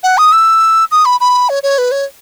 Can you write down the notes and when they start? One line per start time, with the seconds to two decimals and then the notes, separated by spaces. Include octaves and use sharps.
0.03 F#5
0.18 D#6
0.32 E6
0.91 D#6
1.05 B5
1.20 B5
1.49 C#5
1.63 C#5
1.78 B4
1.91 C#5